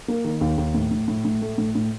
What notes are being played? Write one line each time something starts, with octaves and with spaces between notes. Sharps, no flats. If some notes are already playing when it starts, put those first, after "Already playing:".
A#3
D#3
D#2
D#2
A2
A2
A2
A2
A3
A2
A2